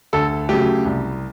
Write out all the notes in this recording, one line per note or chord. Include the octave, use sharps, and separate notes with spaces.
D2 A4
C#3 F#3 A3 G4
C2